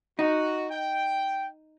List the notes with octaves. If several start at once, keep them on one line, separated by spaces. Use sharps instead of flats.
D#4 F#4
G5